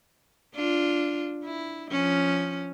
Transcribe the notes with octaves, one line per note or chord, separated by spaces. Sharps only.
D4 F4
E4
F3 C#4